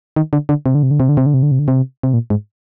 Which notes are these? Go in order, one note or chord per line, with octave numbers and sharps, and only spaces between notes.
D#3
D3
D3
C3
D3
C3
D3
C3
D3
C3
D3
C3
D3
C3
D3
C3
C3
A#2
G#2